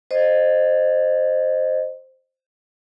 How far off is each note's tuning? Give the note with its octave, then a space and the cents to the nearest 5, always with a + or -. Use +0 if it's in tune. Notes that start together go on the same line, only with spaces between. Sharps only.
C5 +0 D#5 -20